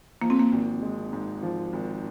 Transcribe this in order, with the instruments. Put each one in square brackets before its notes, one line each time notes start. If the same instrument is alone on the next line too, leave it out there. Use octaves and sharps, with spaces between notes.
[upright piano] F3 [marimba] A#3
[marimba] C4
A#3
[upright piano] G#1
G#3
G#2
F3
G#1